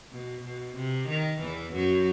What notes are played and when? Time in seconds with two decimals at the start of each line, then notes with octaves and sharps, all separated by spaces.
0.12 B2
0.43 B2
0.76 C3
1.09 D#3
1.40 E2 E3
1.73 F#2 F#3